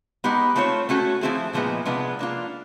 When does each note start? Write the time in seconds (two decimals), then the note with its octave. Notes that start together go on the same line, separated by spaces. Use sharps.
0.24 G#3 B3 D#4 G4
0.56 A3 C4 F4 A4 C#5
0.89 A3 C#4 F#4 A4
1.21 F3 A3 C4 E4 G#4
1.53 A#2 F3 G#3 B3 D#4
1.86 C3 F3 G#3 B3 D4
2.19 A#3 D4 F4